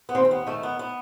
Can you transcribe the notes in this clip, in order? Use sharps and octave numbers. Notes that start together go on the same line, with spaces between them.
B3
D#2 C4
C4
B3
D#3 A3
B3
B3